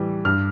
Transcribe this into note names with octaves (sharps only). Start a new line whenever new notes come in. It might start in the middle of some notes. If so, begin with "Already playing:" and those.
Already playing: A2 E3 G3
G2 F6